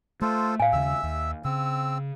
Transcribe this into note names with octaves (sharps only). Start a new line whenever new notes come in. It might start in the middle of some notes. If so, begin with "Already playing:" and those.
A3 F4 A4 C5
A2 F5 G#5
D#2 C#3 E5 E6
D#2
C#3 C4 E6